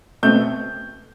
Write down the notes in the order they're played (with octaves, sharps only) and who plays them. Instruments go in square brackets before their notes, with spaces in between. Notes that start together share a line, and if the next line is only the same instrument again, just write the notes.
[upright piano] B2 A3 C4 G6